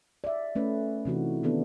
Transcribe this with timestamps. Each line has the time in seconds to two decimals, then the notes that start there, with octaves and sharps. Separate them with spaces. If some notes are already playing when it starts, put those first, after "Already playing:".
0.24 D5 E5
0.55 A3 C#4 B4
1.05 C3 E3 D#4 F#4
1.43 D#3 B3 D4 A4